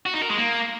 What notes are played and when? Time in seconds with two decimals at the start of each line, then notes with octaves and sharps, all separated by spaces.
0.06 F#4
0.14 D#4
0.22 A#4
0.30 G#3
0.38 A#3